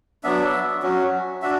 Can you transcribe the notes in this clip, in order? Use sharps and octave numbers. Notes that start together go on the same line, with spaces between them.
F#3 B3 D4 E5
F#3 C#4 F#4
D4 F#4 E5